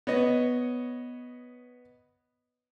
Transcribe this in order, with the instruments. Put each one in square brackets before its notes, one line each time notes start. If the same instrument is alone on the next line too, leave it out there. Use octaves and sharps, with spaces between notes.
[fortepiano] B3 C#5 D#5